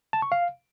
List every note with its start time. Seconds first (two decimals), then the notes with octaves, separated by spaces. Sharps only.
0.13 A5
0.22 C#6
0.32 F5